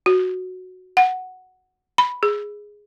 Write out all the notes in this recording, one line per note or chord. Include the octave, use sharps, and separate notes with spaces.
F#4
F#5
B5
G#4